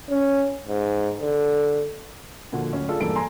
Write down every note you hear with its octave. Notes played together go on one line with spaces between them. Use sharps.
C#4
G#2
D3
A#2 D3 F3 F#4
D1 C#4
D4 F4 G#4 A4
E1 E2 G2 A#3 A4 D7
G#5 A#5 C6